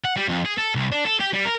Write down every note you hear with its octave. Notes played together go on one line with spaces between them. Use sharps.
F#5
G3
F2
G#4
A4
C2
D4
A4
G4
G3
A#4